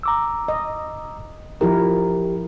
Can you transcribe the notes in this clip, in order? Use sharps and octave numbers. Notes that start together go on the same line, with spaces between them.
A#5 D6 E6
D#5
F3 E4 G4 A#4